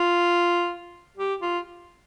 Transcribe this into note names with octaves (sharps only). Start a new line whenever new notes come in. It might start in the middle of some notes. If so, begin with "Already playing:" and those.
Already playing: F4
G4
F4